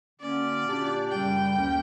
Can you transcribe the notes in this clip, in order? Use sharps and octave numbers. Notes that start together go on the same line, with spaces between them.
D3 A#3 C#4 F#4 D5
A#2 A#3 D4 G4
F#2 C#3 G3 G5
D2 D3 A#3 C#4